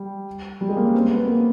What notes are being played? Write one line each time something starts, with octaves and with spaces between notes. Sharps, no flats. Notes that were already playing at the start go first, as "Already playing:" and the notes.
Already playing: G3
G3
G#3
A#3
C#4
C4
B3
A#3